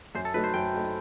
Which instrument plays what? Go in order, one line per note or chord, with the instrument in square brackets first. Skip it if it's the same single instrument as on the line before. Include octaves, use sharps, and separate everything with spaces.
[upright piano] F#2 [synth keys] C5
[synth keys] A4
[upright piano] F#3 A3 D#4 [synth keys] B4
[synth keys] C5
[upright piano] F#2 [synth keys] G5
[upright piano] F#3 A3 D#4